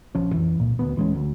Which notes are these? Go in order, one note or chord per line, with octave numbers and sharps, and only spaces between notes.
A#1 F3 C#4
F2 E3
C#2 A#2
D2 B3
D1 E3 G#3 C#4
D2